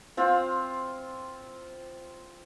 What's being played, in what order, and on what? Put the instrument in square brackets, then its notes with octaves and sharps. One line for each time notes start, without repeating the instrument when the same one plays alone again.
[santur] C4 F4